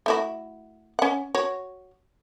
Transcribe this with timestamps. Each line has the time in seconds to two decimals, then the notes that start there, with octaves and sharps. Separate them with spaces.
0.06 A3 E4 F#4
0.99 C#4 F#5
1.35 F#4 C#5